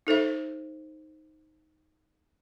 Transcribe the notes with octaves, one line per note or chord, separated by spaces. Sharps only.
D#4 A4 C5 E5